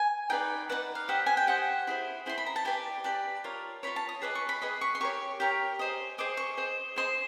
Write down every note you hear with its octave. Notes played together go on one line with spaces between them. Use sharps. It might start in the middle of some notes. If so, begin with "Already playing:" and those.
Already playing: G#5
D#4 G#4 B4 D5 G5
D#4 G#4 B4 D5 F#5
F5
G4 C5 D#5 F#5
G#5
G5
G4 C5 D#5 F#5
E4 G#4 C5
E4 G#4 C5 C6
B5
A#5
A5
G4 B4 D5 G#5
G4 B4 D5 A5
F4 A#4 C#5
F4 A#4 C#5 B5
A5
D#6
G#4 B4 D#5 D6
C#6
B5
G#4 B4 D#5 B5
C#6
C6
G4 A#4 C#5 C#6
G4 A#4 C#5
G#4 C5 D#5
G#4 C5 D#5 D6
C#6
G#4 C5 D#5
G#4 C5 D#5 C6